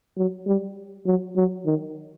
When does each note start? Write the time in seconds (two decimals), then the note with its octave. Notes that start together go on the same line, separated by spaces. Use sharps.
0.17 F#3
0.47 G3
1.06 F#3
1.36 F#3
1.66 D#3